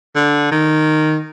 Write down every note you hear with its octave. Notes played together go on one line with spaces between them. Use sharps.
D3
D#3